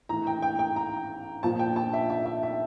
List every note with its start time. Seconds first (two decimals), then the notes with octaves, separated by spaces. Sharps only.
0.09 A2 E3 A#5
0.27 G5
0.42 G5
0.59 G5
0.76 A#5
1.43 A#2 F3 A5
1.59 G5
1.76 A5
1.93 E5
2.10 E5
2.26 E5
2.43 E5